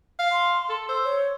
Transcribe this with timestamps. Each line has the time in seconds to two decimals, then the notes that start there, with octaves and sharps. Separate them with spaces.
0.19 F5
0.32 C6
0.69 A4
0.89 C5 E6
1.05 C#5